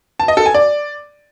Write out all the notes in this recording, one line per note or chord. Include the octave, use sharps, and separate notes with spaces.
A5
D#5
A4
G#5
D5